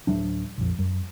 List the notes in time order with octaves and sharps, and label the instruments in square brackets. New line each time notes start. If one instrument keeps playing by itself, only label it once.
[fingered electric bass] D1 F#3 D4
A#1 F2
F#2